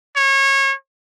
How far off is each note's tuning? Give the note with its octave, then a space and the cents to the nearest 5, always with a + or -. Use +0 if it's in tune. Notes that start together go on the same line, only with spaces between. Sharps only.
C#5 -25